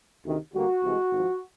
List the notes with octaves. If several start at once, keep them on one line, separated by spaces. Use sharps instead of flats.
D2 C3 D#3
D2 D3 G3 A#3 F#4
C2 C3 E3 G#3
G#1 G#2 F3